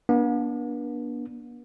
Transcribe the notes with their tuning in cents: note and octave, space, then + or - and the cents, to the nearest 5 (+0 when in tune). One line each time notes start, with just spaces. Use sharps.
B3 -45 D4 -10